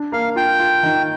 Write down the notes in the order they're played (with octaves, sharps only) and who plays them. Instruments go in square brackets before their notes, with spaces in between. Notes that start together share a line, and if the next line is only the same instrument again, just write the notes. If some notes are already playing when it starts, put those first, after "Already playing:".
Already playing: [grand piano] D4
[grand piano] A#3 [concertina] F5
[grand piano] F4 [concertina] G5
[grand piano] F4
D#3